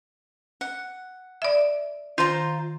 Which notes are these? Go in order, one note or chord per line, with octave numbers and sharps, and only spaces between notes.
F#5
D5 E5
D#3 F4 C5 A#5